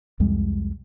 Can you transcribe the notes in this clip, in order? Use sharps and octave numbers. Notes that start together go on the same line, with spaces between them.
C2 F2 G3 G#3